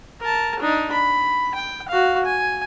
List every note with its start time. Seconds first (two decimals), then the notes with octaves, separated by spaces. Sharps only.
0.21 A#4 A5
0.60 D4 D#4
0.92 B5
1.55 G5
1.88 F#4 F5
2.25 G#5